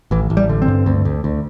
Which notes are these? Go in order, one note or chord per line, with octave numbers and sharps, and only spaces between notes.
A1 E3
A1
G3
D3
C4
G2
D2
D2
D2